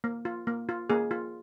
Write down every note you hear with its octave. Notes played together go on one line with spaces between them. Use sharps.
A#3
F4
A#3
F4
A#3 G#4
F4